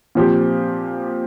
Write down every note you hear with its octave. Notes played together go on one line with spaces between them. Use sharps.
A#2 F3 C4 G4